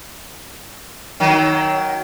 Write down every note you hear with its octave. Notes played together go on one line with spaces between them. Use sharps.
D#3 F#3